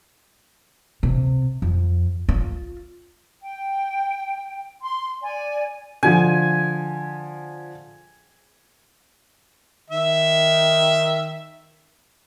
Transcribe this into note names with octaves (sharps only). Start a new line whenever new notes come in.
C3
F2
F4
G5
C6
D5 G#5
D3 F3 G#5
D#3 E5